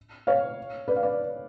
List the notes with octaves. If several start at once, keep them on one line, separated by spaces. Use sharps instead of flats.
C#5 F5
B4 D5
F5
B4 D5